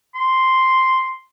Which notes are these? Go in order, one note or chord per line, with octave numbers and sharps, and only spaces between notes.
C6